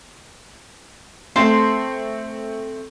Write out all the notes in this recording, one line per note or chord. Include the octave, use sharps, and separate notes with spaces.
A3 C4 C5 A5 C6